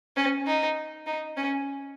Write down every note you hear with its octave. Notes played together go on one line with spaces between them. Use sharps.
C#4
D#4
D#4
C#4